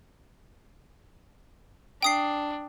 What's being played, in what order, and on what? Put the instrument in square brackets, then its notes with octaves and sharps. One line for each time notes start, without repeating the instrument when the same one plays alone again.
[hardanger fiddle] D4 [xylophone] G5 D#6 C7